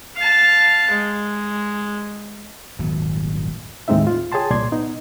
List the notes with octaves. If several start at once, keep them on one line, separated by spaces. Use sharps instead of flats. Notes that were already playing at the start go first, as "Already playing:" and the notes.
F5 A5
G#3
D#1 G#1 F2 F#3
D#2 A2 G#3 C4 D#4 E5
F4
G#4 C#5 G5 A5 C6
C2 A#2 D5 C6 G#6
B3 D#4